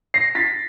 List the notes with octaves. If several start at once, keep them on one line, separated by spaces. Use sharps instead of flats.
A#6 C7
A6 B6